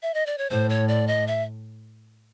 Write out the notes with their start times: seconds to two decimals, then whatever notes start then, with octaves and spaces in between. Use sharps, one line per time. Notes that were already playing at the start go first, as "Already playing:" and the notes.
0.03 E5
0.14 D#5
0.26 D5
0.38 C#5
0.50 A2 C5
0.69 C#5
0.88 D5
1.07 D#5
1.27 E5